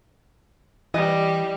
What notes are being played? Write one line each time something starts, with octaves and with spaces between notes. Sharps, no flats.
E3 G3 D#5